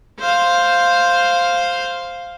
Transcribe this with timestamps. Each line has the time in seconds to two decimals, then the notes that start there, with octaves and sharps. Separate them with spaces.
0.20 C5 F5